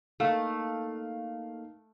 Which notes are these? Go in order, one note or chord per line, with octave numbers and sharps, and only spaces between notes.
A3 A#3 D#4 A4 F5